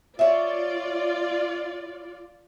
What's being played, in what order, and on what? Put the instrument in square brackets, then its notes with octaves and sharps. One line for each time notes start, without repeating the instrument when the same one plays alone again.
[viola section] F4 D5 [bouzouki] C#5 E5